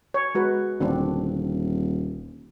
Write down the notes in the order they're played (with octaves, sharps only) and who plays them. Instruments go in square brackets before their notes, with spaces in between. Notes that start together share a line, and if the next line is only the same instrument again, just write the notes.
[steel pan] C#5
G#3 F#4 B4
[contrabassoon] D#1 [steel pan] D3 C4 D4